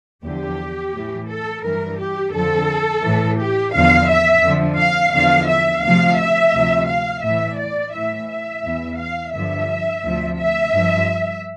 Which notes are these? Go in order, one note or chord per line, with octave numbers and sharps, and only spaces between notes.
E2 D3 F3 G4
A2 E3
A4
G2 E3 A#4
G4
F2 D3 F3 A4
A2 E3
G4
E2 D3 F3 F5
E5
F2 D3 F3
F5
E2 D3 F3 F5
E5
D2 C3 F3 F5
E5
D2 C3 F3
F5
A2 E3 E5
D5
A2 E3 E5
E5
E2 E3
F5
G2 D3 F3 E5
D2 C3 F3
E5
G2 F3